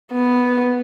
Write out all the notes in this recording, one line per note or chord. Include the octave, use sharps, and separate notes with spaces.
B3